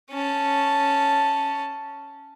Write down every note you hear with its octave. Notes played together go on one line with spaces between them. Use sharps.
C#4 A5